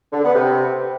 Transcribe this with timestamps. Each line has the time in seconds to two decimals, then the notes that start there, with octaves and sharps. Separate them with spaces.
0.12 D3
0.23 B3
0.35 C3